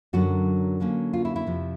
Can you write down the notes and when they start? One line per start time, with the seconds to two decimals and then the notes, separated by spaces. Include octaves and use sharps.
0.13 F#2 D3 F#3 F#4
0.80 D3 F#3 A#3 C#4
1.13 F4
1.25 E4
1.36 E4
1.47 F2 C3 F3